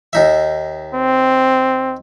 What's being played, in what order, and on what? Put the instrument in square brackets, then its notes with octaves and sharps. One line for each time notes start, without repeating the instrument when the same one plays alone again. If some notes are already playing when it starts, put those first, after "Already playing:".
[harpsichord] D#2 D#4 E5
[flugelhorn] C4